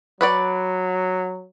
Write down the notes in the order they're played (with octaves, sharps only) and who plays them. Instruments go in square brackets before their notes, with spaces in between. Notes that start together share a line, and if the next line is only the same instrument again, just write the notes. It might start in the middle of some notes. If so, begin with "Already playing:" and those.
[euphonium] F#3 [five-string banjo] B4 C#5 D5